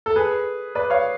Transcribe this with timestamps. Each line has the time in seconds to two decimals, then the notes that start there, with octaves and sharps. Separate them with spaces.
0.06 A4
0.16 G#4 B4
0.75 B4 D5
0.90 C#5 F5